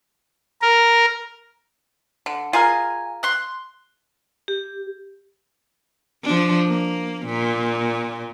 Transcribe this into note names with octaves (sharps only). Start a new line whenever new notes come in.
A#4
D3
F4 G#4 A#4 G#5
C6 F#6
G4
F3 D4
A#3
A#2